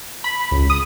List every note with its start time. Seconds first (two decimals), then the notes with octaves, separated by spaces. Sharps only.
0.24 B5
0.51 C#2
0.70 D#6